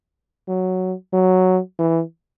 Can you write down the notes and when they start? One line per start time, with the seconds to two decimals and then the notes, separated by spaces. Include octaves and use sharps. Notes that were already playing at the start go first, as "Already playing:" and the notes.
0.48 F#3
1.13 F#3
1.79 E3